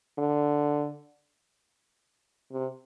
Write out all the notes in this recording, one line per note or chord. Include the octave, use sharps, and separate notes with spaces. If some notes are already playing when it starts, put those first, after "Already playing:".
D3
C3